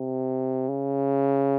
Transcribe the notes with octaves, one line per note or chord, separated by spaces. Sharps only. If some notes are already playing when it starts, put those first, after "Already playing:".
Already playing: C3
C#3